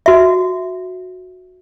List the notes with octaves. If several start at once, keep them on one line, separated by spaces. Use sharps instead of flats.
F#4 E5